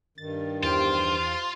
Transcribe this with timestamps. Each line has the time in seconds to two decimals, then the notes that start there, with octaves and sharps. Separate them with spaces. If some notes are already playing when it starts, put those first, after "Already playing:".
0.18 G2 D#3 A6
0.63 E2 F4 G4 C5 D7